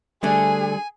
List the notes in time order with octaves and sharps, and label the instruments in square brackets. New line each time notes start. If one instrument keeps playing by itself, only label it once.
[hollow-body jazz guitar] D3 A3 D4 [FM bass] G3 [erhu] G#4 [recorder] G#5